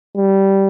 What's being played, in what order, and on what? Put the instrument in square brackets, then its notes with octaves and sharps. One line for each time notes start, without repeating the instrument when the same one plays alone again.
[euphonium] G3